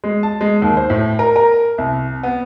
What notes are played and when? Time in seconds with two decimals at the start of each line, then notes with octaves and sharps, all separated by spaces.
0.04 G#3
0.23 A5
0.41 G#3
0.62 D#2
0.77 C5
0.90 A2
1.19 A#4
1.36 A#4
1.78 C2
2.23 B3